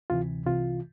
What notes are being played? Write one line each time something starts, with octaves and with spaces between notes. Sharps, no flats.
D2 C3 E3 F4
C2 C3 E3 F4